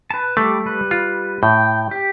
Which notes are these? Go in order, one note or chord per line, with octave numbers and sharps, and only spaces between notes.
B4 A5
G3 A3 D6
G3 B4
F4
A2 G5
G4